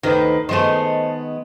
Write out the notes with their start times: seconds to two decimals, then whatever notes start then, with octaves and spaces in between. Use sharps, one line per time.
0.03 D2 D#3 B4 C5
0.49 D#3 G#3 A3 B3 C5